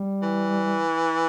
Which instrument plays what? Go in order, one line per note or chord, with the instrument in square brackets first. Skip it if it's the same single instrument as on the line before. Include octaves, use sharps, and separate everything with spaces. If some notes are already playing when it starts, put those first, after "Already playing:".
Already playing: [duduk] G3
[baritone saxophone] E3